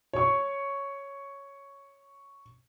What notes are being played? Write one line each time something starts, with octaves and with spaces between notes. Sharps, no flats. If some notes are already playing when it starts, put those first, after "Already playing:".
C#5 C#6